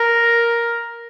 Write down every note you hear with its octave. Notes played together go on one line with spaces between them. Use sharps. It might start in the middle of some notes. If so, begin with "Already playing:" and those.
Already playing: A#4